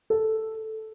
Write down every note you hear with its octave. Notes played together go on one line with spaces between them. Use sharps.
A4